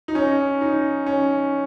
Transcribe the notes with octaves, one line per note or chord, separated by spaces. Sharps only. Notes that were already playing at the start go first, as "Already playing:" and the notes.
D#4
C#4
D#4
C#4